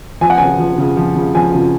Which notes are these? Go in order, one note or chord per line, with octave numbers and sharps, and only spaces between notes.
F3 G#5
F#5
C#3 G#5
F3
C#3
F3
C#3
F3 G#5
C#3